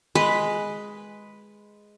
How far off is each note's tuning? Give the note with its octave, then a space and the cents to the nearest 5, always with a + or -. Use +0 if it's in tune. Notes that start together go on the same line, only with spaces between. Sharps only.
G#3 +0 B4 +0